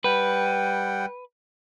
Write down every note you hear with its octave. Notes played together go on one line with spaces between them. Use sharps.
G3 B4 F#5 G5